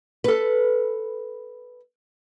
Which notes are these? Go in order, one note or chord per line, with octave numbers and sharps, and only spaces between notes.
A4 B4